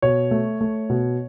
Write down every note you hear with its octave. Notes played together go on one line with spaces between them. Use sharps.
B2 C#5
A3
A3
B2